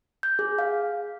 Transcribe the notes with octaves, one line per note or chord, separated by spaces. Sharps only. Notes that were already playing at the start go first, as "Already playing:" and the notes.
G6
G#4
F5